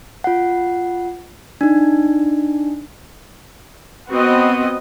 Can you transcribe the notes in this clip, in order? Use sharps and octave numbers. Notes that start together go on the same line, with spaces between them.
F4 F#5
D4 D#4
B3 C4 F#4 D#5